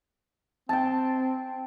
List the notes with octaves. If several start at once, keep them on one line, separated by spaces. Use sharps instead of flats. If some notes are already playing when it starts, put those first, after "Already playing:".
C4 G5 A5